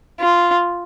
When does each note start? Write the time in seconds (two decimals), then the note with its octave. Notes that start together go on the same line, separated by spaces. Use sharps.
0.20 F4